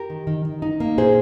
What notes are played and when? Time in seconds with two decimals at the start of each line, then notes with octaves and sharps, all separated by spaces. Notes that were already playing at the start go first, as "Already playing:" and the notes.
Already playing: G4 A#4
0.10 D#3
0.27 D#3
0.45 D#3
0.62 D#4
0.80 A#3
0.98 A#2 G#4 C5